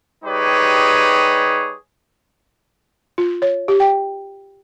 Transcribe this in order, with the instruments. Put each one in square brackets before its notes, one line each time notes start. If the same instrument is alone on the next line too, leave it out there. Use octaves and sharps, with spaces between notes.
[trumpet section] G3 D#4 G4 G#4 B4 C#5
[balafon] F4
C#5
G4
G5